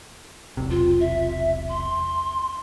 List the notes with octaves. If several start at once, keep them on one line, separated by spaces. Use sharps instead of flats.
E1 B1 C3
F4
E5
C6